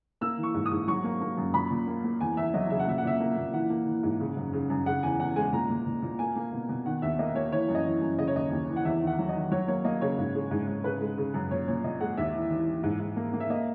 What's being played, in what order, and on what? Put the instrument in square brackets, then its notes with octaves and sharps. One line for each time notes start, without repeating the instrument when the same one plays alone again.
[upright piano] A#3 E6
E3
C#6
G#2
D#6
G#2
F#3 C#6
A#3
A#3
F#2
A#2 B5
A#2
A#3
A#3
E2 G#5
E2 E5
F#3 D#5
C#3 E5
F#5
A#2 E5
F#5
A#2 E5
A#3
A#2
E3 F#5
A#3
E3
G#2
C#3
F#2
C#3
F#2
C#3 F#5
E2 G#5
E2 F#5
G#3 G#5
A#2 A#5
A#2
A#2
A#2
A#3 G#5
A#3
B2
B2
D#3 F#5
D#2 E5
A#3 D#5
A#3 C#5
E3 C#5
F#2
D#5
E3
F#2
C#3 D#5
C#5
D#2 D#5
D#2
E3
F#5
E2 E5
D#3
F#5
F#3
D#5
D#3
F#3 C#5
A#3 C#5
A#3 D#5
C#3 C#5
G#2
G#3
G#2
G#2
C#3 B4
G#3
C#3
F#2
A#2 C#5
A#2 C#5
A#2 D#5
G#3 F#5
D#2 E5
E3
E3
E3
G#2
G#2
A#3
A#3
E5
A#3 D#5